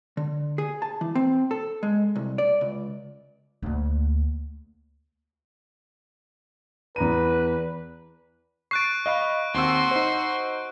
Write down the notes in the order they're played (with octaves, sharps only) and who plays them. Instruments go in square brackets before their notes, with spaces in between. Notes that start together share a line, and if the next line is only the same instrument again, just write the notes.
[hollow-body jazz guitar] D3
G#4
A5
E3
C4
A4
G#3
C2
D5
C#2
[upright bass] D2 A#3
[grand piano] E2 A#5 D#7 [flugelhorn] B4
[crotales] C#6 F#6 D7 [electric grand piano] A6 C7
[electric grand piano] D#5 F5 B5
[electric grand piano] D#2 C4 E6 [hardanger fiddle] F#4 C6
[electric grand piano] D#4 C5